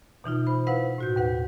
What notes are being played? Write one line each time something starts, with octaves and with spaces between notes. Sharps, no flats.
B2 E3 D#4 F4
C5 B5
E4 B4 C5 F5 F#5
A2 F#4 G6
D#2 B4 F#5